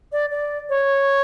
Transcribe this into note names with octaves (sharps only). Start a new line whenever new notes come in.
D5
D5
C#5